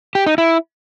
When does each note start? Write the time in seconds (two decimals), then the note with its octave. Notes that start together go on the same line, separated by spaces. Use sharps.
0.15 G4
0.27 D#4
0.38 E4